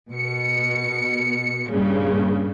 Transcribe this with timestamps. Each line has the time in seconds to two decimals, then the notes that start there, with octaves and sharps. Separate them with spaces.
0.12 B2 C#7
1.70 G2 A#2 C#3